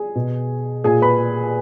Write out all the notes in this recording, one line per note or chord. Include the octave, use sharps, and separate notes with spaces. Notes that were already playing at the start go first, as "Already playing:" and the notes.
Already playing: G#4 G#5
B2
A#2 G#4 G#5
B4 B5